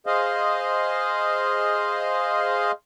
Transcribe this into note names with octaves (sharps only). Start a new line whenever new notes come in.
G#4 C5 D#5 F5